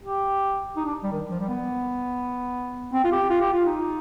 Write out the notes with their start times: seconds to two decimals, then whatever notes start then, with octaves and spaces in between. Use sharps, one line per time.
0.03 G4
0.76 D#4
0.85 D4
1.03 G3
1.12 D#3
1.31 F3
1.40 G3
1.48 B3
2.93 C4
3.04 F4
3.12 G4
3.30 F4
3.41 G4
3.53 F4
3.66 D#4